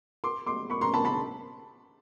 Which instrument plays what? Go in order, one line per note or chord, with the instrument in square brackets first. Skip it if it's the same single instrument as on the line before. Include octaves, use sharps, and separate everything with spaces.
[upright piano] C6 D6
C6 D6
B5 C#6
A#5 C6
A5 B5
A5 B5